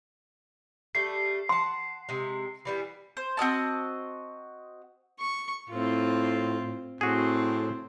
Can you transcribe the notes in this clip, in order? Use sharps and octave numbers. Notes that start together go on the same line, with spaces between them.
G3 A3 A4 C7
F#5 A5 C6
C3 G#3
E3 G3 B3
C5
C4 F#4 D#5 A5
C#6
A2 C4 F4
A2 C4 F#4 G#4